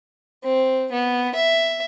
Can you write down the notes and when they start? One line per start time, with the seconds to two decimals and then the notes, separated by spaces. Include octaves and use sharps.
0.43 C4
0.92 B3
1.35 E5